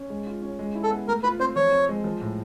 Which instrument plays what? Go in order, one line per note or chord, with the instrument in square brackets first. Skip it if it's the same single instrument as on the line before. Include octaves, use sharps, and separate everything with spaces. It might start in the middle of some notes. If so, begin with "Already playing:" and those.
Already playing: [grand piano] C#4
G#3
F4
C#4
G#3
E4
[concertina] A4
[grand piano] B3
[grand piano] A3 [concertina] A#4
[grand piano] F4 [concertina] B4
[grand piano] C4 [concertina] C5
[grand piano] F3 [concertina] C#5
[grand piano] C4
G#3
F3
A2